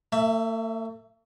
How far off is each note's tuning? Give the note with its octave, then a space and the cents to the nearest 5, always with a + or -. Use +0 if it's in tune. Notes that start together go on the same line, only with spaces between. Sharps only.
A3 +45 E5 +0